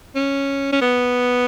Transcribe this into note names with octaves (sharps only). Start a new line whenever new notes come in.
C#4
C#4
B3